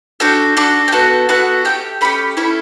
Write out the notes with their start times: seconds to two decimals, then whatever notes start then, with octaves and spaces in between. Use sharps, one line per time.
0.20 D4 F#4 A4 G5
0.57 D4 F#4 A4 F#5
0.88 G5
0.92 B3 F#4 A4 F#5
1.29 B3 F#4 A4 F#5
1.65 A3 C#4 G4 G5
2.01 A3 C#4 G4 B5
2.37 C#4 E4 A4 B5